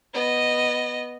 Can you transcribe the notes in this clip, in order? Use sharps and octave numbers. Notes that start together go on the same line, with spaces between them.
B3 D#5